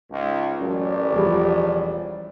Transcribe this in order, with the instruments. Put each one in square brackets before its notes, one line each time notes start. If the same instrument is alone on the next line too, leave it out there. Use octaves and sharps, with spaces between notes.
[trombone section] C#2 [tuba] G#2
[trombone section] A1 [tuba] F#2 [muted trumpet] D5
[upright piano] E1 G3 [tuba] F3